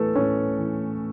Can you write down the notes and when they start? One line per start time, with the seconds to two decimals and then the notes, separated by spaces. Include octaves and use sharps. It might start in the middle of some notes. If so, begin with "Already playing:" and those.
Already playing: A2 E3 A3 B3 A4 B4
0.15 A2 C#4
0.57 E3